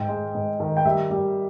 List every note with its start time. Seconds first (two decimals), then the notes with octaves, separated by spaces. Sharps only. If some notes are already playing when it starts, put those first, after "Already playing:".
Already playing: G#2 G5
0.08 G#3
0.35 G#2
0.60 D#3
0.77 G5
0.85 G3 E5
1.11 G3